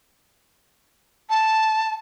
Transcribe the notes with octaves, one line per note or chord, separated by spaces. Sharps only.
A5